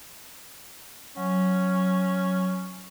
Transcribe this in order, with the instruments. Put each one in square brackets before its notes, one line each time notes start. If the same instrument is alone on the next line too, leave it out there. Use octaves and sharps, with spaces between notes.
[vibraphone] F#3 [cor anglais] C#4